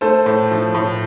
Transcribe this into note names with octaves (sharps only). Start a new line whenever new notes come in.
A3 A4 C5
A2
F3
A2